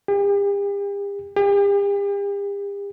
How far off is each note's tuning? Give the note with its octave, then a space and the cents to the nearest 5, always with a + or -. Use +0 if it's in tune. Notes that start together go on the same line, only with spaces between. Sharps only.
G4 +40
G4 +40